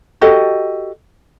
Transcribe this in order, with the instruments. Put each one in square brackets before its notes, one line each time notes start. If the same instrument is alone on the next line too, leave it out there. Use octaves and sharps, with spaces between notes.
[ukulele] F#4 G4 A4 D#5